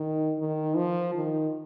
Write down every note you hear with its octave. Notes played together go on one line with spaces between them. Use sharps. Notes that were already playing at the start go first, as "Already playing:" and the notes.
Already playing: D#3
D#3
F3
D#3